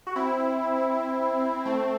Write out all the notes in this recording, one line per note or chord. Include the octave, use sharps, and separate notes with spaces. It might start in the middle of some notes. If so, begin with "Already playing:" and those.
F#4
C4 E4
A3 C4